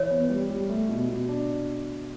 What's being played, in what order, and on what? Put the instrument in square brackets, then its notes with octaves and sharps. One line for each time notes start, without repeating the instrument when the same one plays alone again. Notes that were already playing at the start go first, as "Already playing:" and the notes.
Already playing: [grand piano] E3 [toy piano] C#5
[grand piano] B3
G3
G3
A3
B2
B2
D4